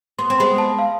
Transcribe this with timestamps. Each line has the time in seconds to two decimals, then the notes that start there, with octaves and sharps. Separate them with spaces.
0.19 B3 C6
0.30 C4
0.38 G#3 B3 B5
0.58 A5
0.79 F5